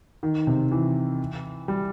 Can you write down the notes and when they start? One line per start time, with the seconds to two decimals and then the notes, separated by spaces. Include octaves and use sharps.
0.23 D#3
0.47 C3
0.72 E3
1.68 G3